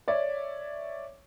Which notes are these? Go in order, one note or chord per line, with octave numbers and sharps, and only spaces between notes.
C#5 D5 E5